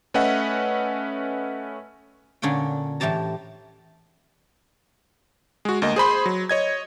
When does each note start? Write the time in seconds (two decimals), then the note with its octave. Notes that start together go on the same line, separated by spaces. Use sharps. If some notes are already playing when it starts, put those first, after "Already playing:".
0.14 A3 C#4 B4 D#5 E5 F#5
2.42 A#2 D3 C#4 F#5 G5
3.00 A2 E3 G4 A5 A#5
5.65 G#3 F#4
5.82 D2 A#3 D#5
5.96 G#4 C5 B5 C6
6.26 F#3
6.49 C#5 D#5 G#6